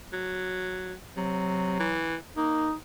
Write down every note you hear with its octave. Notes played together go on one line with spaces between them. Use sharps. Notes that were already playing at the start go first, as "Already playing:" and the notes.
F#3
C3 F#3
E3
A#3 D#4